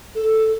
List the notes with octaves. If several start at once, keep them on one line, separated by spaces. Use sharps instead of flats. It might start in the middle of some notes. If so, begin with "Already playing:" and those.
A4